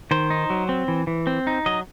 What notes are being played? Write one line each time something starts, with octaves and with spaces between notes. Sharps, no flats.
D#3 C5
D#4
F#3
C4
E3
E3
C4
D#4
F#3 D#5